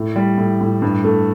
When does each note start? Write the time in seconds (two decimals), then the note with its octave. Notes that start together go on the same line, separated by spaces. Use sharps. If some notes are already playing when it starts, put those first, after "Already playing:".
Already playing: A2
0.16 G3
0.38 A2
0.61 A2
0.82 G2
1.04 A3